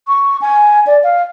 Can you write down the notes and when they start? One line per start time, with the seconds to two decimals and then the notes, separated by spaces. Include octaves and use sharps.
0.08 C#6
0.41 G#5
0.87 D5
1.04 F5